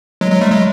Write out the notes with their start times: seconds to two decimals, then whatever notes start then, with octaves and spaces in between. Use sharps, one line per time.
0.21 F#3 G#3
0.31 F#3 G#3
0.41 G3 A3
0.51 F#3 G#3